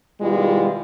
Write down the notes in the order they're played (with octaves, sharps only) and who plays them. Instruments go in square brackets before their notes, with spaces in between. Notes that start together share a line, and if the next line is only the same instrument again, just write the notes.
[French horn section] B2 D#3 G3 G#3 E4 F4